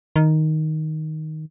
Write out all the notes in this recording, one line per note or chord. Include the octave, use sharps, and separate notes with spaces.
D#3